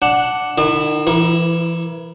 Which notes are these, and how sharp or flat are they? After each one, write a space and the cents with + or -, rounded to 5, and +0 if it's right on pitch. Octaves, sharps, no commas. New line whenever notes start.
D4 +0 F#5 +0
D#3 -40 E4 +0 D#5 -45
E3 +30 E4 +0 A#4 +20